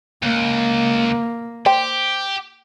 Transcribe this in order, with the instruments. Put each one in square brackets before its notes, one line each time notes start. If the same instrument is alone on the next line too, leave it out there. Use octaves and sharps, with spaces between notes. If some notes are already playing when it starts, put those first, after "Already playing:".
[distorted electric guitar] C#2 [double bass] A#3
[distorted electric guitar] G4 [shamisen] C5 G5